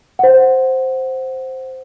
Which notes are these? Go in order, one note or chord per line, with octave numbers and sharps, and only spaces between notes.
C5 F#5